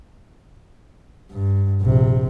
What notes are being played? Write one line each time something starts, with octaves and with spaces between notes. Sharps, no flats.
G2
A#1 C3